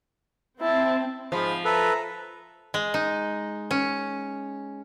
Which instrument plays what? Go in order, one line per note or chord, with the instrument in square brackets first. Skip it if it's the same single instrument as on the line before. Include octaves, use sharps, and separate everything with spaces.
[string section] C4 [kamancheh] E4 A5
[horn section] G#2 B5 [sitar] F3
[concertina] A4 B4 [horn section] E5 A#5
[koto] G#3
D#4
C#4